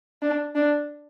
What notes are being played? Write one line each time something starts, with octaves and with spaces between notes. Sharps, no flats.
D4
D4